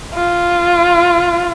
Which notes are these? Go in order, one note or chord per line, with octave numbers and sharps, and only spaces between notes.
F4